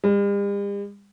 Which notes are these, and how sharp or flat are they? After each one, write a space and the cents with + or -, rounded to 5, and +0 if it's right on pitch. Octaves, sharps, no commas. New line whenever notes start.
G3 +45